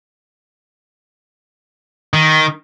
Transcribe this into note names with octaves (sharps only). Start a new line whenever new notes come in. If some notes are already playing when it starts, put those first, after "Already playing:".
D#3